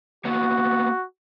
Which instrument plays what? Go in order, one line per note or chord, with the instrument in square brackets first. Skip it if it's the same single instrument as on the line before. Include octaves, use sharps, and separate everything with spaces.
[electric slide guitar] A#3 B3 C#5 [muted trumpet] F#4